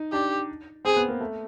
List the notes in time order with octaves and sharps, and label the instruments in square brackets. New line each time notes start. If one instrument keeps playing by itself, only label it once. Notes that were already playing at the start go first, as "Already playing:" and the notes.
Already playing: [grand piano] D#4
[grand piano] D4 [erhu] G4
[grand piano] C4 [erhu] G#4
[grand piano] B3
A#3
A3